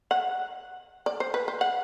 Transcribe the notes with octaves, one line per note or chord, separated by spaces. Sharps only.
F#5
D5
C5
B4
C5
F#5